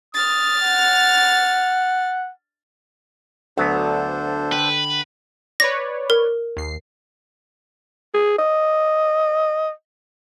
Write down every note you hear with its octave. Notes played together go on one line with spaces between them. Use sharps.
D#6 F6 A6
F#5
D2 D3 F#3 B3 D4 A4 C5
B4 G5
B4 C#5 D5 A#6
A#4
D#2 C7
G#4
D#5